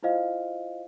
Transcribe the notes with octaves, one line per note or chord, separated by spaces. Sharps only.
E4 F4 C5 D#5 F5